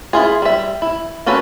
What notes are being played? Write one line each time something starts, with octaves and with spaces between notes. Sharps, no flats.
E4 F4 G#4
G3 E5
E4
A#3 C#4 F#4 A4 B4